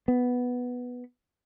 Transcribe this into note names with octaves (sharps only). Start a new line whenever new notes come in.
B3